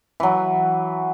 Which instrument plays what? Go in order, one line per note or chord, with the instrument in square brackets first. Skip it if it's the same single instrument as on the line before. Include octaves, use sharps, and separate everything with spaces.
[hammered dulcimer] E3 F#3